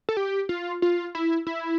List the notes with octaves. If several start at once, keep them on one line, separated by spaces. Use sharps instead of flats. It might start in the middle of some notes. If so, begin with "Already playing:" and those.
A4
G4
F4
F4
E4
E4